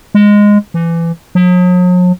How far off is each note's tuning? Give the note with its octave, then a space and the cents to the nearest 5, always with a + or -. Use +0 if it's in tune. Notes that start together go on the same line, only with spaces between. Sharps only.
G#3 -10
E3 +25
F#3 -45